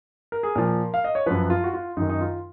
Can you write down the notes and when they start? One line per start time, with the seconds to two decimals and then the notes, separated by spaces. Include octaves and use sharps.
0.32 A#4
0.43 G#4
0.55 A#2 F3 A#4
0.94 F5
1.04 D#5
1.15 C#5
1.26 F#2 F3 B4
1.50 F4
1.64 F#4
1.74 F4
1.97 F#2 D#4
2.01 D#3
2.09 D#4
2.21 F4